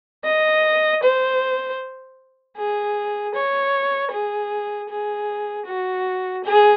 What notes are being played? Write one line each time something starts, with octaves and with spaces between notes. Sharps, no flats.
D#5
C5
G#4
C#5
G#4
G#4
F#4
G#4